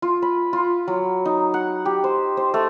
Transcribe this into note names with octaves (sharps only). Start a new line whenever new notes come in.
F4
B5
F4
F#3
D#4
F#5
G4
C5
C5
A3